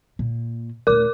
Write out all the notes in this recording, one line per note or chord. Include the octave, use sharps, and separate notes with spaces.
A#2
D#1 A3 A#4 D6